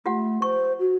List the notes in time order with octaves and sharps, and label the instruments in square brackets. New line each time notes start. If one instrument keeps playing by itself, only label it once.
[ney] A3 [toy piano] F4 G4 F#5
[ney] C5 [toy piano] C#6
[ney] F#4